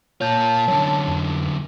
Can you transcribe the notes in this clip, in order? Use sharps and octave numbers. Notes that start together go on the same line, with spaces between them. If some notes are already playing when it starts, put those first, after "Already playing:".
A#2 F4 C#5 A5 G6
F#2 D3 C#5
F2